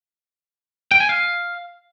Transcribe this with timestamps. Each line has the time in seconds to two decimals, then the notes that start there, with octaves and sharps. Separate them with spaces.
0.91 G5
1.00 G#5
1.09 F5